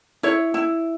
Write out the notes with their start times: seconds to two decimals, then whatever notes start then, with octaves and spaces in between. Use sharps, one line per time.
0.23 E4 C#5
0.54 E4